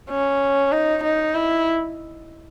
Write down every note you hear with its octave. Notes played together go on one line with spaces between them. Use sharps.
C#4
D#4
D#4
E4